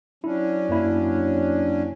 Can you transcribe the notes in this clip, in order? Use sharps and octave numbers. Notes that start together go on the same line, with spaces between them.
F#3 C#4 D4 E4
F#2 A#3 E4